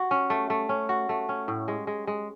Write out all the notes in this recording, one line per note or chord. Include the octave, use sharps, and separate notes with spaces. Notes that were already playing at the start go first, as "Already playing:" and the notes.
Already playing: F#4
C#4
A3
A3
C#4
F#4
A3
C#4
A2
G#3
G#3
G#3